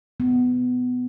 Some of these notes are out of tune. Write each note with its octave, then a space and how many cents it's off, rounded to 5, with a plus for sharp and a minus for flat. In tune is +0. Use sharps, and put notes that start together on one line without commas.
B3 +15